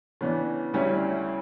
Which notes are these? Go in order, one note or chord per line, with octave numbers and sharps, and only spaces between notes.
C#3 E3 B3 D4
D2 C#3 G3 C#4 E4